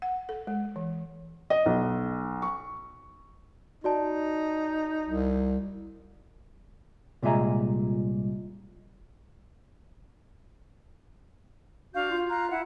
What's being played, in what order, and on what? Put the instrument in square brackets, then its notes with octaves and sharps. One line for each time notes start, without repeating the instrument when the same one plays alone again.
[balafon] F#5
A4
G#3
E3
[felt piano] D#5
B1
C#6
[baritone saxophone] D#4 [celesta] F#4 D5 A5
[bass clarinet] C2
[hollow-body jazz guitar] C2 A#2 G#3 E5 G#5 A#5
[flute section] D4 F5 G6 [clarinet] F#4
[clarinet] F4
[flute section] F5 A#5 F#6
E4 F#5